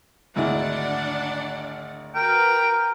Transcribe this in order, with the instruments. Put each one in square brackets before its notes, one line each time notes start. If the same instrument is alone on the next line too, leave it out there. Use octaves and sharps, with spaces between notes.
[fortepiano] G#1 D2 E4 [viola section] D4 D5 F#5
[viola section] F#4 B4 [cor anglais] A#4 [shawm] G5